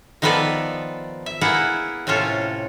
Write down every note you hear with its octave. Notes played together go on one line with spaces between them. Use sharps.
D#3 F3 B3 A4 B4 D5
E5
A#3 B3 E4 G#4 F#5
A2 C3 C#4 F4 A4